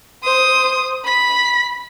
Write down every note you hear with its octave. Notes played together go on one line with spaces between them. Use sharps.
C5 D#6
B5 B6